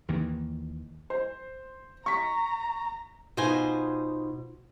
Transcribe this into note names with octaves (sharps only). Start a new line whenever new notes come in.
D#2 D#3 E3 A#3
C5
A#5 C#6 B6
B2 D#4 F4 C5 G#5